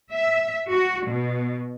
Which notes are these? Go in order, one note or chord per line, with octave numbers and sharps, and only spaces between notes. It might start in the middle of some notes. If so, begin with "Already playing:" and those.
E5
F#4
B2